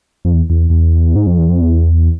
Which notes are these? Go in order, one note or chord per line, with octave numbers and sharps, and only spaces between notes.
F2
E2
E2
E2
G#2
F2
E2
F2
E2